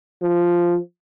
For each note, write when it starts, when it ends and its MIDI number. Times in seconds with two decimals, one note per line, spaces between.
0.23 0.78 53